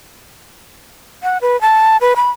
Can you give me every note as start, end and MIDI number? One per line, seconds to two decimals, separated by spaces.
1.23 1.38 78
1.42 1.59 71
1.61 1.97 81
2.01 2.14 71
2.16 2.31 83